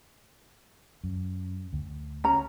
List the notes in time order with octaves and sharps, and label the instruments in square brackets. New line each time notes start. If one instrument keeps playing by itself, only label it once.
[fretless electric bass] F#2
D2
[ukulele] C#4 A#5